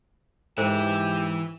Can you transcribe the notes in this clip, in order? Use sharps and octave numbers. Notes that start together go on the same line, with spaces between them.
G#2 E3 E4 G4 C5